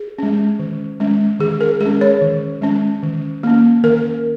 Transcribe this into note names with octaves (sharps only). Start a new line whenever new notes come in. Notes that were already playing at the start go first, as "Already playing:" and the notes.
Already playing: G#4
G#3 C#4
D#3
G#3 C#4
D#3 G#4
A#4
G#3 G#4
C#4
C#5
D#3
G#3 C#4
D#3
A#3 C#4
D#3 A#4